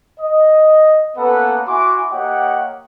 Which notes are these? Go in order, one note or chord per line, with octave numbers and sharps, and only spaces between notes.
D#5
A#3 B3 C#4 A4 B4 F#5
E4 F#4 G#5 C6 D6
A#3 G4 C#5 D#5 F#5 G5